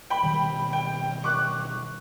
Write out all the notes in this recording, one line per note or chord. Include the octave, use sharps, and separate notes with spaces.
G5 B5
B2 D#3 G3
G5
C#6 D6 F#6